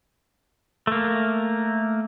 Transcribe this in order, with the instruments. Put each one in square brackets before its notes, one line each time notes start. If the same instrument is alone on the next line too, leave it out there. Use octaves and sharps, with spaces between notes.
[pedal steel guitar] A3 A#3